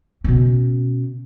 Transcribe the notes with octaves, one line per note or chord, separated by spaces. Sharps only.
B2 C#4